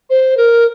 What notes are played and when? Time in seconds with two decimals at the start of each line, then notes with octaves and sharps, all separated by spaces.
0.10 C5
0.37 A#4